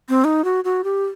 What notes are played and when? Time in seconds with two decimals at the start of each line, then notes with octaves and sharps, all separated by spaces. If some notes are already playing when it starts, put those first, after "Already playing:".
0.09 C4
0.24 D#4
0.44 F#4
0.64 F#4
0.84 G4